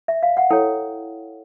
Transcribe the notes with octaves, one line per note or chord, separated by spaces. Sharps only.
E5
F5
F#5
E4 A4 C#5 G5